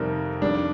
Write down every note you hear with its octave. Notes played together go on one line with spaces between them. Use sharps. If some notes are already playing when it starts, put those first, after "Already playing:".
Already playing: F2 C3 D#3 G3 C4 A#4
F2 D#3 G3 D4